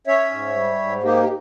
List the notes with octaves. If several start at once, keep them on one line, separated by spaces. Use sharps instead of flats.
C#4 C#5 E5
G#2
G3
G#2
A#3 D#4 G4
G4